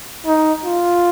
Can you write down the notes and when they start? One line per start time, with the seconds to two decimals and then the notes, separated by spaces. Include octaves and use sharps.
0.26 D#4
0.64 F4